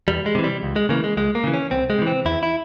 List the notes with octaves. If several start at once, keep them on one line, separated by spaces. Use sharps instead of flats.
E2 G3
G#3
C3 E3
G3
C#2
G#3
C#3 E3 A#3
G#3
C#2 G#3
A#3
C#3 E3
C#4
C2 C4
G#3
C3 E3
C4
E2 E4
E4